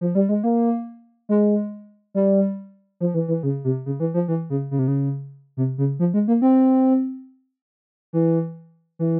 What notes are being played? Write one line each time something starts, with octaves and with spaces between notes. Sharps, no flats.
F3
G3
G#3
A#3
G#3
G3
F3
E3
E3
C#3
C3
C#3
E3
F3
E3
C#3
C#3
C3
C#3
C3
C#3
F3
G#3
A#3
C4
E3
E3